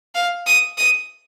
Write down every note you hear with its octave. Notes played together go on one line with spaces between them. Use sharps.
F5
D#6
D#6